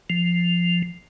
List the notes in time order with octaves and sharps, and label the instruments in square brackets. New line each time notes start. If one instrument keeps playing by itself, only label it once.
[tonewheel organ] F3